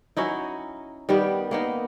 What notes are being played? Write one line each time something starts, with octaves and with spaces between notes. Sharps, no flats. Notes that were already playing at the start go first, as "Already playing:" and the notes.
F#3 C#4 D#4 E4
D#3 G3 B3 G4
A#3 B3 D#4